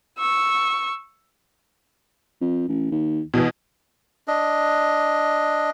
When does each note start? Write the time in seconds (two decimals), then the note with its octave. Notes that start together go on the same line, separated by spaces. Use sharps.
0.19 C#6 E6
2.41 F2
2.68 A1
2.91 D#2
3.34 E2 B2 E3
4.28 D4 D#5